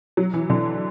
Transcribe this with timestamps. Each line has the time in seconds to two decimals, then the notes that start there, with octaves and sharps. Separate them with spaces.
0.17 F#3
0.34 E3
0.50 D3